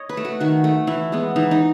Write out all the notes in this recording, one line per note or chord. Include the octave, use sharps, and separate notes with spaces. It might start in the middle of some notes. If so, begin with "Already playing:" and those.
Already playing: C#5 D#5
B4
A3
F#4
D#3 F#4
A3
E3 E4
G#3 B3
E3 D#4
D#4